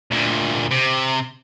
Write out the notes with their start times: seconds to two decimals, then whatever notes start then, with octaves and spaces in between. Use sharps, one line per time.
0.11 D2 A#2
0.71 C3